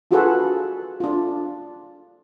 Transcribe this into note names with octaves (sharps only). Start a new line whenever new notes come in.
D4 F4 F#4 G#4 A4 B4
D4 F4